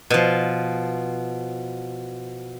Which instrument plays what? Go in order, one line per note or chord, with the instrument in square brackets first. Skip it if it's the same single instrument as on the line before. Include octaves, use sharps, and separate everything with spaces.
[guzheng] B2 F3